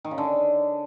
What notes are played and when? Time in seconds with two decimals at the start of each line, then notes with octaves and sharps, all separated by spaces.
0.04 D#3
0.11 C#3
0.18 D3